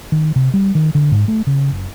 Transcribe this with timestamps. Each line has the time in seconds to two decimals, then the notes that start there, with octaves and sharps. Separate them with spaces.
0.12 D#3
0.36 C3
0.54 G3
0.75 D#3
0.95 D3
1.11 G#2
1.28 A3
1.47 C#3
1.71 F#1